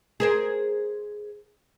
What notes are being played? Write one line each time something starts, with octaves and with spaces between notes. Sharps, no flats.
G#4 A#4 C5